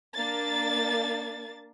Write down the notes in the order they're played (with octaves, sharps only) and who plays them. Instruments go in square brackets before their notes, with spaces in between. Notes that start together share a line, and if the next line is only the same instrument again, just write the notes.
[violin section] A#3 D4 A6